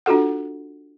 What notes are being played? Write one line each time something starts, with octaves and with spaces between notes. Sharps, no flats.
D4 F4 F#4 A4 F#5